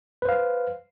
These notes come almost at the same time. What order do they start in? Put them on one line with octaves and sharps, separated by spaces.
B4 C5 F5